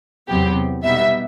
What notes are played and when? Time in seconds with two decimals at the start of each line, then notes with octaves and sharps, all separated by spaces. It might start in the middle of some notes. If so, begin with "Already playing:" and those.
0.28 E2 C3 F#3 B3 G4
0.83 B2 G3 B3 D#4 E5